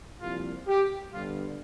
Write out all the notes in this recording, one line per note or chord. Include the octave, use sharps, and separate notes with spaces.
C2 A#2 F3 F4
G4
G1 G2 D3 F4